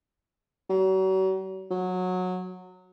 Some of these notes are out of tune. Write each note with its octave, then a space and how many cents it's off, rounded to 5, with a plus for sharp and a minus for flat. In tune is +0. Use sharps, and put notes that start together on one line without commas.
F#3 +40
F#3 -15